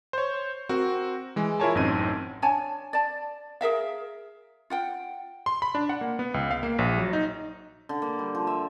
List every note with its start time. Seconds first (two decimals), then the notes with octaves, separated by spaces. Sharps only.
0.13 C5 C#5
0.69 C4 F#4 A#4
1.36 E3 G#3
1.60 E4 F4 A#4 C#5 G#5 A5
1.75 A1 F#2 C4 D#4 G#6 D#7
2.42 D4 C#5 G#5 A5
2.93 D5 A5
3.61 G#4 A#4 E5 F5
4.70 F4 F#5 G5
5.46 C6
5.62 B5
5.75 D4
5.89 F#5
6.01 A#3
6.19 B3
6.34 C#2
6.51 F5
6.63 A#3
6.79 A#1
6.98 F#3
7.13 D#4
7.89 D3
8.02 A#3
8.19 G3
8.35 F3
8.47 E5